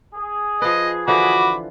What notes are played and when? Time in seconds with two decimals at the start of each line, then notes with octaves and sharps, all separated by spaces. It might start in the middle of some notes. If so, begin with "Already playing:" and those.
0.14 G#4
0.62 F3 B4 D#5
1.08 D3 E3 F3 F#4 B5 D6